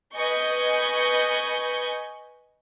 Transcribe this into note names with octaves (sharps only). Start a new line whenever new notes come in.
B4 D#5 G#5 C#6 G6